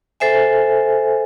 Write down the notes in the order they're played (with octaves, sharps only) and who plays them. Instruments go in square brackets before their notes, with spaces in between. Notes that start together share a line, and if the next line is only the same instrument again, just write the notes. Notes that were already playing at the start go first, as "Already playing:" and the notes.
[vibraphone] A4 C5 E5 G#5